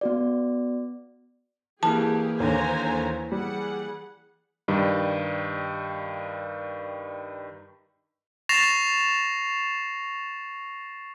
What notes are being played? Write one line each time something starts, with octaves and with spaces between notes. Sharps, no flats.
B3 F#4 D5
E3 A#3 G4 G#4 A5
D#2 D3 C5 C#5 G#5 A#5
G3 G#4 F#5
G2 D#3 G3
C#6 A6 A#6 C7 E7 F7